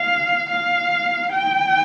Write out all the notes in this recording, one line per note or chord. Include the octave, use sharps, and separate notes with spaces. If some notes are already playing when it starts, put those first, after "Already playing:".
Already playing: F5
F5
G5